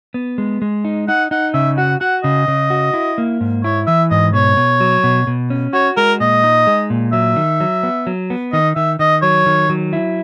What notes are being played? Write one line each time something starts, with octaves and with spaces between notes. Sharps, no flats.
B3
G#3
G#3
D#4
D#4 F#5
D#4 F#5
C#3 E5
F#4 F#5
F#4 F#5
C#3 D#5
C#3
F#4
E4
A#3
G#2
E4 C#5
E3 E5
G#2 D#5
B2 C#5
B2
F#3
B2
B2
C#4
F#4 C#5
G#3 A#4
A#2 D#5
D#4
G#3
A#2
F#3 E5
D#3
F#3
B3
F#3
B3
D#3 D#5
D#3 E5
D#3 D#5
F#3 C#5
D#3
F#3
E4